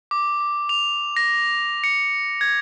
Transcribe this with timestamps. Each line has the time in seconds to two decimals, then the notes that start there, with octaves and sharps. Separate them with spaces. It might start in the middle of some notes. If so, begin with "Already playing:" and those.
0.11 D6
0.40 D6
0.69 F7
1.17 A#6
1.84 C#7
2.41 G#6